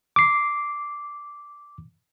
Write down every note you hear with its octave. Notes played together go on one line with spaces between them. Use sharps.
D6 C7